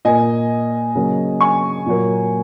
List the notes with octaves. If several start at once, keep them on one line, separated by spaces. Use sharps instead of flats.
A#2 A#3 D#5 G#5
C#3 F#3 A#3
G#5 C#6
A#2 F#3 A#3